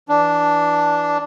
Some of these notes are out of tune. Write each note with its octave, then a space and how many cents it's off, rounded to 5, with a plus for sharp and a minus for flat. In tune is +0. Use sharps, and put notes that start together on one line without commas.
E3 +0 D4 +0